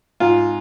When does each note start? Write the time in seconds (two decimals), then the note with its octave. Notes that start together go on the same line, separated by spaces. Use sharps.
0.20 G#2 F4